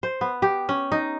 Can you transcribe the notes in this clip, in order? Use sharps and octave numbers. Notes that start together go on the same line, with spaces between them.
C5
B3
G4
C#4
D#4